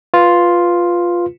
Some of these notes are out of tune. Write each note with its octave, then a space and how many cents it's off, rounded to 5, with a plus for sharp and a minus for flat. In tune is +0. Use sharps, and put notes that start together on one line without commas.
F4 +0 B4 +0